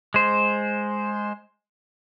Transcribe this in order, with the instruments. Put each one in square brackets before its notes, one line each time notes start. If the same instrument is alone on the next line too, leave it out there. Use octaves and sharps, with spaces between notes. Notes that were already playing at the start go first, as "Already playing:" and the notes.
[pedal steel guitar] G#3 C5